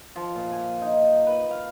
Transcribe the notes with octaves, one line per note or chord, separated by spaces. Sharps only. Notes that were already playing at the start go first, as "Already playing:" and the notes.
F3
A#2
G#5
D#4
B4
F5